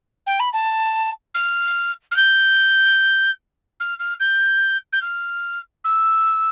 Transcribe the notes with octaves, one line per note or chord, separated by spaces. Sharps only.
G5
B5
A5
F6
F6
G6
F6
F6
G6
G6
F6
E6